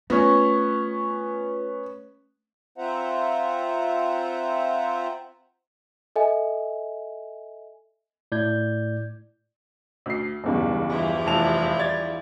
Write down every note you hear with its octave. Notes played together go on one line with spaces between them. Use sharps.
A3 B3 C#4 F4 B4 C#6
C4 F4 C5 E5 F#5 A#5
A4 D#5 E5 G#5
A2 D5 G6 G#6
D2 C7
F#1 B1 E2 G2
E3 F3 E4
F1 A5 F7
D5 G#6 A6